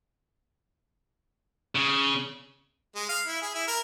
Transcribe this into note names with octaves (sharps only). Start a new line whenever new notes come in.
C#3
G#3
F5
E4
G#4
E4
A#4